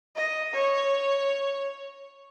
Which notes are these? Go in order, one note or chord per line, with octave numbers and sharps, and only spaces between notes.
D#5
C#5